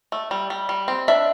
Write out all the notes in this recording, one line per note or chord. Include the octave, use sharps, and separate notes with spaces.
A3
G3
G3
G3
C4
D4 E5